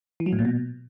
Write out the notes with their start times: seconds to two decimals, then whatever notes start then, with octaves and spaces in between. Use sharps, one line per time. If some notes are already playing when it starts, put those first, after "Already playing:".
0.20 E3
0.26 F#3
0.33 A2
0.39 A#2
0.45 B2